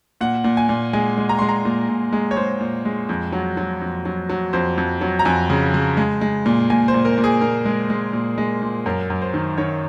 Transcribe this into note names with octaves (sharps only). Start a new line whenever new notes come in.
A#2 F#5
A#2
G#5
A#2
G#3 G#5
G#3
A#5
G#3 C6
A#5
A#2
A#2
G#3
C#5
G#3 C5
A#2
G#3
F2
F#3
F#3
F2
F#3
F#3
F2 C5
F2
F#3
A#5
F2 G#5
C#3
C#3
G#3
G#3
A#2
A#2 G#5
C5
A#2
A#4
A#2
G#4
A#2 A#4
G#3
G#3
A#2
G#3
A#2
F#2 A#4
F#2
C5
D#3
D#3 C#5